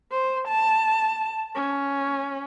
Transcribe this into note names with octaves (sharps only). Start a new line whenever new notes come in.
C5
A5
C#4